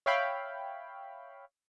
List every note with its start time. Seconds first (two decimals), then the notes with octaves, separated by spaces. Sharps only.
0.06 C#5 E5 F5 G5 B5